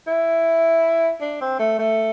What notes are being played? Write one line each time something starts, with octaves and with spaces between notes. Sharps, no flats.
E4
D4
C4
A3
A3